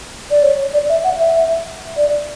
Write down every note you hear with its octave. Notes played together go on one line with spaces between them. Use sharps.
D5
C#5
D5
E5
F#5
E5
D5